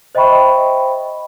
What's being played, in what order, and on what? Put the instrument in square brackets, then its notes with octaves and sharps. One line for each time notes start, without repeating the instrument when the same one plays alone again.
[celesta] C5 D#5 E5 G5 B5 C#6